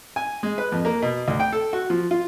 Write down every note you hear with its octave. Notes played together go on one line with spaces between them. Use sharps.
G#5
G#3
B4
F2
A#3
B2
D2
G5
A4
F#4
F3
F4